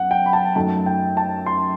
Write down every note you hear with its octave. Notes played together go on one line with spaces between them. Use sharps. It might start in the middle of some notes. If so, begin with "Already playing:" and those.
Already playing: F#2 B3 F#5
G5
B5
A5
F#2 F#3 A3 D#4 A5
G5
A5
C6